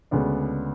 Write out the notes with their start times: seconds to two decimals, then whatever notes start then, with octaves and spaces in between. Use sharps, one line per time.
0.11 D2 C#3 G#3 B3 D4